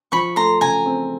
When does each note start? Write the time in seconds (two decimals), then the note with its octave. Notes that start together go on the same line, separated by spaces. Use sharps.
0.12 F3 B5 C#6
0.36 A3 A#5 C6
0.61 C#3 G#5 A#5
0.86 C4